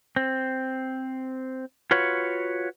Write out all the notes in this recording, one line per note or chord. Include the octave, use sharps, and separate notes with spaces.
C4
F4 F#4 B4 C#5